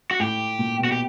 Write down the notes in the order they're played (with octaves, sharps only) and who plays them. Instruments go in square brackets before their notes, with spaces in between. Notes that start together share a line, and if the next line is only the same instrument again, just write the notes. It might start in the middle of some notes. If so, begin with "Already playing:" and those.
[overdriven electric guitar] F#4
[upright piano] A2 [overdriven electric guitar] G4
[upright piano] A#2
B2
[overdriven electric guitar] F#4
G4